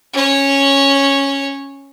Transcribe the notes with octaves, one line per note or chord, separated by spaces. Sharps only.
C#4 C#5